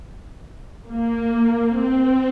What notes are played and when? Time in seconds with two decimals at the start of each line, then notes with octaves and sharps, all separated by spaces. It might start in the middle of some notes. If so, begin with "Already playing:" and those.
0.90 A#3
1.79 C4